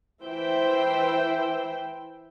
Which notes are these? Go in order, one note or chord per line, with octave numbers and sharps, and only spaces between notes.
E3 E4 C5 E5 G5